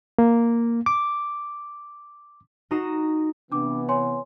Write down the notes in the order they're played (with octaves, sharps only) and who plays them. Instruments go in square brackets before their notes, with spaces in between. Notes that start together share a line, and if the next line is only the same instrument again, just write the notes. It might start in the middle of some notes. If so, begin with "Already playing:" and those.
[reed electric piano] A#3
D6
[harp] D#4 F#4 A#5 D#6 C7 E7
[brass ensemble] C3 E3 B3 [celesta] D4 D6
[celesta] C#5 G#5 C6